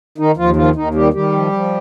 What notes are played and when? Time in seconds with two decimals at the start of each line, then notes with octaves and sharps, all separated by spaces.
0.18 D#3 D#4
0.37 D#2 F3 F4
0.56 D#3 F3 F4
0.75 D#2 D#3 D#4
0.94 D#3 G3 G4
1.13 D#3 G3 G4
1.32 F3
1.52 F3